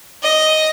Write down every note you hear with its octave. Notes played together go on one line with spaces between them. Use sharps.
D#5